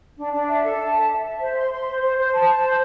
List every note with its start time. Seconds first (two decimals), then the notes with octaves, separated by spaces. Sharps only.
0.18 D4
0.32 D4
0.48 E5
0.64 A4
0.78 A5
0.94 E5
1.09 E5
1.25 E5
1.40 C5
1.55 C6
1.71 C6
1.87 C5
2.02 C5
2.17 C5
2.33 A5
2.48 A5
2.63 C5